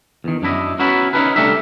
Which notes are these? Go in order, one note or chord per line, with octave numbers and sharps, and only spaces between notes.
E2 D#3
F#2 D4 E4 D#5
B3 C#4 E4 F#4 A#4
C#4 D#4 E4 G#4 A#4 B4
C2 A3 D4 G4 A#4 E5